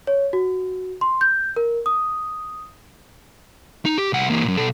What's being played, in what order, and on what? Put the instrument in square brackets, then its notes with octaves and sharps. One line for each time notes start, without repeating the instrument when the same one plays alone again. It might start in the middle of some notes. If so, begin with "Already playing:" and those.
[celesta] C#5
F#4
C6
G6
A#4
D#6
[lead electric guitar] D#4
G4
C2 F#5
E3 A#3
F#2 A#2
B2 A4